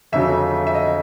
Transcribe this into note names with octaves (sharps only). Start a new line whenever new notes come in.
G1 F2 C#3 F#3 E5
E5
D#5